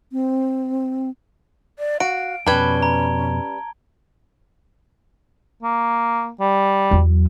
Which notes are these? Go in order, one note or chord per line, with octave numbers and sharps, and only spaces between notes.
C4
D5
F#4 F5 D7
F2 B2 G3 C#4 B4 A5 G#6 G7
A#5
A#3
G3
E2 F#3